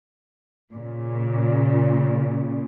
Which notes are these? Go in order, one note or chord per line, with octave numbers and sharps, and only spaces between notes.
A#2 C#3